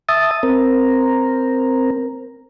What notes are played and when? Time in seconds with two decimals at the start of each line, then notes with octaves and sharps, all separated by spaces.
0.09 E5 A5 D#6
0.43 C4 A#4